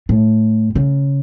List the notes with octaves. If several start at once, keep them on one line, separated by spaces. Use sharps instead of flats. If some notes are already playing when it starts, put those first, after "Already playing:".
A2
C#3